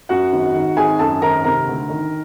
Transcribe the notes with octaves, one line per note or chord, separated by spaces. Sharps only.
F#2 F#4 F#5
G#1
D#3
G#1 G#4 G#5
F#2 A4 A5
G#1 A#4 A#5
C3 A#4 A#5
D2
D#3